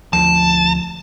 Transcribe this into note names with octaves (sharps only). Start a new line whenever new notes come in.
D2 F3 A5